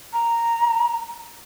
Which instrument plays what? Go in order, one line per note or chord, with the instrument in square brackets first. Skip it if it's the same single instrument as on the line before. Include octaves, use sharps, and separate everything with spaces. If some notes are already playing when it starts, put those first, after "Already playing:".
[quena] A#5